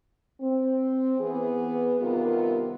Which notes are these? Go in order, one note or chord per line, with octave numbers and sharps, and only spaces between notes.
C4
E3 B3 G#4
C3 D#3 G3 B3 F4 A#4